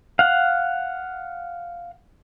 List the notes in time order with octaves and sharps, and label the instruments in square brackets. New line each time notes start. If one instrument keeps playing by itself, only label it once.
[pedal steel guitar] F5 F#5